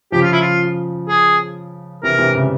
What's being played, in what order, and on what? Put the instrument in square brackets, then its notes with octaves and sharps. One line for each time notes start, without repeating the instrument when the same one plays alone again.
[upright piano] C#3 F3 [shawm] G4
[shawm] F4
E4
F4
G#4
[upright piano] C3 E3 [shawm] A#4
[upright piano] C3 E3
C#3